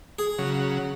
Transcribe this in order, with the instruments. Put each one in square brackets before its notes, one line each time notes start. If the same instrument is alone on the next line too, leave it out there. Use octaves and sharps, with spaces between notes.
[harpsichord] G#4
[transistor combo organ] C#3 F#3